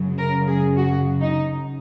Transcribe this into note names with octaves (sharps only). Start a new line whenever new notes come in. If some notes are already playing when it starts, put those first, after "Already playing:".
Already playing: F#2 C#3 F#3
A#4
G#4
F#4
D#4